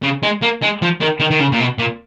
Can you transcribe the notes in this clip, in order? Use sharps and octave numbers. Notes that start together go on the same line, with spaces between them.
C#3
G#3
A#3
G#3
F3
D#3
D#3
D#3
C#3
A#2
B2
A#2